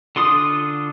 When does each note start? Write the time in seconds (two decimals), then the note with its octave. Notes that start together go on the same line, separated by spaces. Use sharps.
0.16 D3 F4 C6 D#6